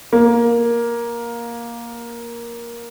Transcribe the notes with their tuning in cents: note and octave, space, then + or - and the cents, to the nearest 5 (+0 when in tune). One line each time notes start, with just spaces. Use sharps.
A#3 +10